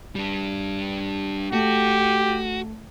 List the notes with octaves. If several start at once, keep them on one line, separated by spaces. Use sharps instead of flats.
G3 D4
A3 F#4 G4